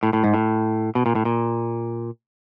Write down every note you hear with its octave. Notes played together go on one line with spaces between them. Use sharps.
A2
A2
G#2
A2
B2
A#2
A2
A#2